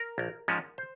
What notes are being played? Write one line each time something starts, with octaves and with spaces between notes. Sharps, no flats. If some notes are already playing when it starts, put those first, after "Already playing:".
Already playing: A#4
A#1
G#2 F3 G#3 C#4
C5